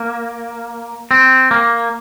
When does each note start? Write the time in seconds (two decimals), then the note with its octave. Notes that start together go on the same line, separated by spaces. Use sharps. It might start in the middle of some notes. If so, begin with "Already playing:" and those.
Already playing: A#3
1.11 C4
1.51 A#3